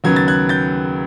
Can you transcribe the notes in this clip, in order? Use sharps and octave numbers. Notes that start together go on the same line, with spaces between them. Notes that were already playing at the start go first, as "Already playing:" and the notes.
D#2 C#3 F#3 B3 G#6
A6
F#6 G#6
G6 A6